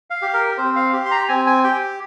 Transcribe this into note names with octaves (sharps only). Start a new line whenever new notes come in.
F5
G4
A#4
C4 C5
F5
G4
C6
A#5
C4 G#5
G#5
G4 G5